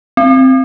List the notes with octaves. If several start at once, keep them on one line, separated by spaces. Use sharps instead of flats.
C4